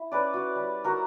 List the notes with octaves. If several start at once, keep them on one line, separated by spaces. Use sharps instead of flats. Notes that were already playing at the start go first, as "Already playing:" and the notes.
Already playing: E4
C#4 B4 D5
F#4
G3
F#4 A#4